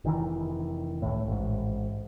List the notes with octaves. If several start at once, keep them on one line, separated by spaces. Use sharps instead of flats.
F1 D#3 E3
C#2 A2
A1 G#2